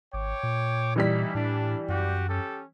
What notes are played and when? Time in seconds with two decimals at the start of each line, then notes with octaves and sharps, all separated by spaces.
0.13 G#1 C#5 G5 D6
0.43 A#2
0.96 E3 G3 D#4 E4 B6
1.35 A2 D4
1.88 F#2 F#4 G4
2.29 C#4 G4 A4